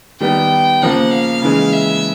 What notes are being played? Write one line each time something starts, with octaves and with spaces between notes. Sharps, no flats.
D#3 G3 B3 G5
C#3 F3 A#3 F#5
F5
C#3 E3 G#3
E5